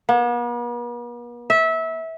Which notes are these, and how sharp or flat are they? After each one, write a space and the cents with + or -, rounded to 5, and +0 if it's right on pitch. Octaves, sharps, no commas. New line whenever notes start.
B3 -45
E5 -20